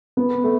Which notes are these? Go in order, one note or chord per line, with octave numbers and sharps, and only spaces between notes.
B3
A3